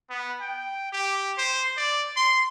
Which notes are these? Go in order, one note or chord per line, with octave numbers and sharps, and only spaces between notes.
B3
G5
G4
C5
D5
C6